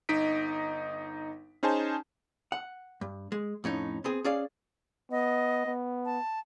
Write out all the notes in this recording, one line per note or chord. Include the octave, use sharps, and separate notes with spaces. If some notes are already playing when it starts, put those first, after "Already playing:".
G1 D#4 D#5 B6 D7
C#4 D#4 G#4 C5 G#5 A5
F#5
G2
G#3
F2 A2 C#4 D#4
B3 C4 G#4
C#4 G#4 D5 F5
B3 D#5
B3
A5